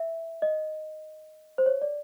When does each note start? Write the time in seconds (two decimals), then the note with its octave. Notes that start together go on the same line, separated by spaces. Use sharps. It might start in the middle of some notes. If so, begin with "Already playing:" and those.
Already playing: E5
0.42 D#5
1.58 C5
1.66 C#5
1.82 D5